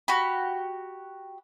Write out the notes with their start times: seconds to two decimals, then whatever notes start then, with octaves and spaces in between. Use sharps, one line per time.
0.08 F#4 G4 B5